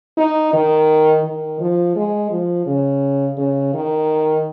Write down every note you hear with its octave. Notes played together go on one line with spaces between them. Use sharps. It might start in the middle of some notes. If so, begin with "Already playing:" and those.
D#4
D#3
D#3
F3
G#3
F3
C#3
C#3
D#3